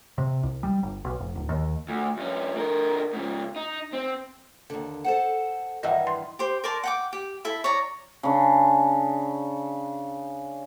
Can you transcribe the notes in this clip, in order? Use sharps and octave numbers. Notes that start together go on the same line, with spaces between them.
C3
C2
G3
G1
B1
F1
D1
D#2
D2
G2 C#4
D3 A#4
G#2 C#3
D#4
C4
D#2 D3
A4 C5 F#5
G2 D#3 E3 D#5 E5 F#5
C6
G4 C5
A#4 D5 A5 C6
F#5 G5 D6
G4
E4 A4 E5
C#5 D5 A#5
C#3 D4